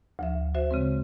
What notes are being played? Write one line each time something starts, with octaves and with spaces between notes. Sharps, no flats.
D2 F3 E5
F#4 C5 E5
C#3 G#3 C4